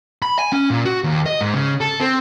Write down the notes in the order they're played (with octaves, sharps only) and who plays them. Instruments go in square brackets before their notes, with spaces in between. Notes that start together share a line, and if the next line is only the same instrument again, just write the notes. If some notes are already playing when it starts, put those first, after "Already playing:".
[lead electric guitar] B5
G#5
C#4
A#2
F#4
D#2
D#5
G#2
C#3
A4
C4